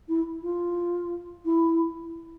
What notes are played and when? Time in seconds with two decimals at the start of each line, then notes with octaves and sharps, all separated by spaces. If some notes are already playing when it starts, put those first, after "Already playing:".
0.08 E4
0.42 F4
1.45 E4